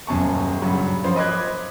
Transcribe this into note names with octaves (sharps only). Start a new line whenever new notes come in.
D#1 F#2 A5 C#6
G2 C#3 F#3
F3 C#4 C5
D#5 B5 D6 F#6 G#6